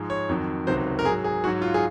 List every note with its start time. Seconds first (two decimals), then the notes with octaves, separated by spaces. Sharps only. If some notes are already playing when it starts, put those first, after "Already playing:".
Already playing: G#2 F3 G#3
0.10 C#5
0.29 F2 D#3 F#3
0.67 C#2 C3 D#3 F#3 C5
0.99 A#4
1.05 G#2 G#4
1.09 F#3
1.24 G#4
1.44 G#2 F#3 F#4
1.62 F4
1.74 G#4